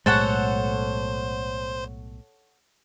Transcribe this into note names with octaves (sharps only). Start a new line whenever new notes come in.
B1 A2 G#3 A4 C5 C#5 F#5